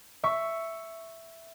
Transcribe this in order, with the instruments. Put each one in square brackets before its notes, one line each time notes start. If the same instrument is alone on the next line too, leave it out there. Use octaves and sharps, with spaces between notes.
[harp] E5 C#6